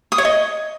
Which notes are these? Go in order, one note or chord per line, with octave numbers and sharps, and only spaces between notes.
D#6
C#5
D#5